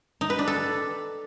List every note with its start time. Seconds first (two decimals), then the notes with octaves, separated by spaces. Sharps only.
0.21 D#4
0.30 B4
0.39 D4
0.47 A4